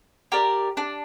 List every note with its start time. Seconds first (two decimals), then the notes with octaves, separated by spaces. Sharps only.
0.32 G4 A#4 D5
0.77 D4